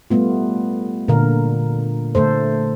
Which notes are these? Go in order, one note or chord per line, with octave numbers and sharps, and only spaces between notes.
G3 A3 B3 F4
A#2 D3 A#4 F5
D3 A3 A4 C5